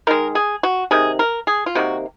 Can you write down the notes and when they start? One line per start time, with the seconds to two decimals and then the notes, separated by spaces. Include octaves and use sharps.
0.07 D#3 G#3 A#4
0.35 G#4
0.63 F#4
0.91 C3 D#3 G#4
1.19 A#4
1.47 G#4
1.66 F4
1.75 C3 D#3 A#3 F#4